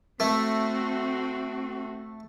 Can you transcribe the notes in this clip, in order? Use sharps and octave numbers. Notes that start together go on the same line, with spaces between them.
A3 C4 F#4